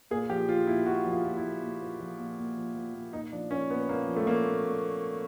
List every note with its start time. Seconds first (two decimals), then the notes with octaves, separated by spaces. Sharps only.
0.11 A#2 G#4
0.30 F3 G4
0.49 F3 F4
0.67 A#2 E4
0.86 A#2 F#4
1.05 F3
1.11 F4
1.25 F3
1.37 E4
1.43 A#2
1.62 A#2
1.82 F3
2.00 F3
2.19 A#2
2.38 A#2
2.57 F3
2.76 F3
2.95 A#2
3.13 A#2 D#4
3.32 F3 D4
3.51 F3 C#4
3.70 A#2 B3
3.89 A#2 A#3
4.08 F3
4.16 A3
4.27 F3 A#3
4.45 A#2
4.64 A#2